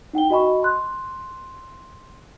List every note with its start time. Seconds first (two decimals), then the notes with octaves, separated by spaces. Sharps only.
0.13 D#4 F#5 G5 G7
0.30 F#4 D#5 G#5 B5 C#6
0.63 C6 F#6